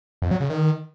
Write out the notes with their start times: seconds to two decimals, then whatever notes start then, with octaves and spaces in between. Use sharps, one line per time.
0.22 F2
0.31 F#3
0.40 C#3
0.50 D#3